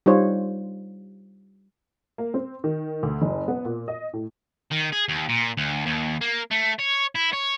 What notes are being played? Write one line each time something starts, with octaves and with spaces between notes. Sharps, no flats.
G3 D#4 F4 C5 C#5
A#3
C4
D#3
D2
F#1
B3
A#2
D#5
A2
D#3
G#4
D#2
A#2
D2
D#2
A#3
A3
C#5
E4
C#5